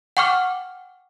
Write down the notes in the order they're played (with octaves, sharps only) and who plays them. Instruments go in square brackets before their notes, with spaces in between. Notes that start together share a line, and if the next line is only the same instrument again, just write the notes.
[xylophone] F#5 G5 C#6 D6 F6